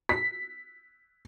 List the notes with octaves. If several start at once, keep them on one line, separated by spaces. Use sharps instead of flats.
B6